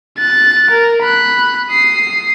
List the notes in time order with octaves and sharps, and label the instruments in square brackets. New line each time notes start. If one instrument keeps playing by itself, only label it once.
[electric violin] F#6 A6
A#4
B5 F#6
D#6 C7